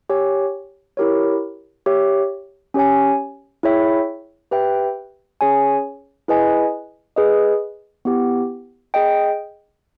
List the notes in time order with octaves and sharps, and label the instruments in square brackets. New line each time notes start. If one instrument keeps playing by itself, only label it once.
[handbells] G4 C#5 G#5
E4 G4 A#4 C#5
G4 C#5 E5
C#4 G4 C#5 G#5
E4 G#4 C#5 E5 G5
G4 B4 E5 G5
C#4 G#4 C#5 G#5
E4 G#4 B4 D#5 G#5
G#4 B4 D#5
B3 E4 G4
G#4 D#5 G5